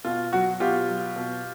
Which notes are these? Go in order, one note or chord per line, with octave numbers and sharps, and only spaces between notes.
B2 F4
F#3 F#4
B2 F4 G4
F#3
B2